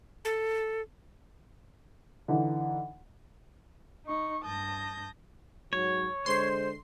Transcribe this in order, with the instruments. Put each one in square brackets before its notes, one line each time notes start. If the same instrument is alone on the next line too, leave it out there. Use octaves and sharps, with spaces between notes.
[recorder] A4
[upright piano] D3 E3 D#4
[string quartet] D#4 C#6
G2 A5 D#6 G6 A#6
[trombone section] G#2 F#3 [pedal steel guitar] C#5
[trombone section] D3 G#3 [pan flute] C5 [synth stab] C6 C7